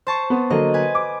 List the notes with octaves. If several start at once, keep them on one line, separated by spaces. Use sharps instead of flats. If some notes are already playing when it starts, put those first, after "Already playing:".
C5 A5 C#6
B3
D3 F#3 A#3 D#5
B4 G#5
D6